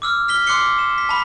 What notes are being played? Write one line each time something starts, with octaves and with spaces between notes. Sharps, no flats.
D6 E6 F6
F6 B6 G7
C6 D6 F#6 C7 C#7 G7
E7
B6
A5 B5